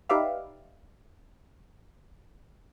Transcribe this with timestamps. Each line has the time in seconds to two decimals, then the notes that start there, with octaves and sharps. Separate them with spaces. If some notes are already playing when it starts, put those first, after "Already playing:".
0.09 D#4 G4 B4 D5 E5 F5